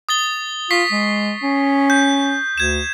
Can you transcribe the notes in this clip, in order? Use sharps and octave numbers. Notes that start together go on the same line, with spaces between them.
D#6 A6 G7
F4 C#6 B6 C7
G#3
C#4
G6
D2 G#6 E7